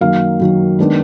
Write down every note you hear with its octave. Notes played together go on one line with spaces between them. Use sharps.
F#2 D#3 F#3 A#3 F5
F#2 D#3 F#3 A#3
D#3 G#3 B3 D4